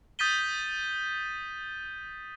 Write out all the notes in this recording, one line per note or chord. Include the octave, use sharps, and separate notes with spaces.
D#6 G6 A6 B6 D#7 G7